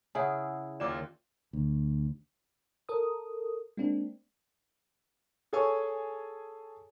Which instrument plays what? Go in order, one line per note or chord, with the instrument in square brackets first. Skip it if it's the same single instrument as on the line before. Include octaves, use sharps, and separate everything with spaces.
[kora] C#3 E4 G#4 [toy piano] F#5 G#5
[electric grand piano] D#2 F4 E7 [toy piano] D5 D6 E6
[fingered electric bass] D2
[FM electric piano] A4 A#4 D#6
G#3 A#3 C4 D4
[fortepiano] G#4 A4 C#5 G#5 C#6